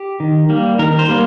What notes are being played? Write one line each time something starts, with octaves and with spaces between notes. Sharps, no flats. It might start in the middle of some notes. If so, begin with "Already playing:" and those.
Already playing: G4
D#3
G3 A#3
D#3 A#4
C5
G3 A#3